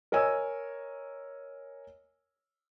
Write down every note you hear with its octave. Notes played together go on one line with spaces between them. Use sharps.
A#4 C#5 D#5 G#5 E6